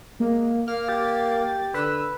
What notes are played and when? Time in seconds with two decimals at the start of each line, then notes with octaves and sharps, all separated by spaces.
0.20 G#3 A#3
0.68 A#3 F5 F6
0.88 G4 A6
1.74 D3 B4 E6